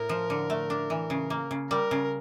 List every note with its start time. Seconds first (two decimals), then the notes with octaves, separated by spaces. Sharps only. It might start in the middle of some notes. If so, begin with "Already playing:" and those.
Already playing: A2 A#4
0.09 F3
0.30 D3
0.50 A3
0.70 D4
0.90 E3
1.10 C#3
1.30 A#3
1.51 C#3
1.70 G3 A#4
1.91 C#3